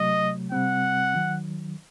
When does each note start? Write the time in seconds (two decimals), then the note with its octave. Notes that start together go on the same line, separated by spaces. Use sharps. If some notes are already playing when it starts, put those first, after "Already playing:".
Already playing: C3 F#3 A3 D#5
0.52 C3 G3 C4 F#5
1.14 D#3 F#3